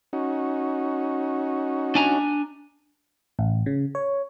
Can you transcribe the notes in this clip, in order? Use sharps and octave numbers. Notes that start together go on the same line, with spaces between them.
C#4 D#4 F#4
D4 G#5 A#5
A1
C#3
C#5